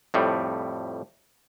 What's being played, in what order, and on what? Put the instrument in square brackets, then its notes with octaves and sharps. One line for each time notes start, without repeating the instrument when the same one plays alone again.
[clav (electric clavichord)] F2 A2 G3